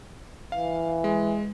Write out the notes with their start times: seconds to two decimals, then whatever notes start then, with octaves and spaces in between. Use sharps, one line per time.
0.52 E3 F5
1.04 G#3